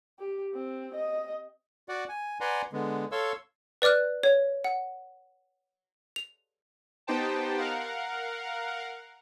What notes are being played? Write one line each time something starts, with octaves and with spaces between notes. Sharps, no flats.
G4
C4
D#5
F#4 D5 F#5
G#5
B4 D5 F#5 G#5 A#5 C6
D3 G#3 B3
A4 C#5 F5 C6 C#6 E6
B4 D5 D6 F6 F#6
C#5
F#5
F7
B3 D#4 G4 C5 G5 A5
A#4 F5 F#5